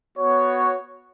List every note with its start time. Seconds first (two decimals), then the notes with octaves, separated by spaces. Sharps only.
0.17 B3 F#4 C#5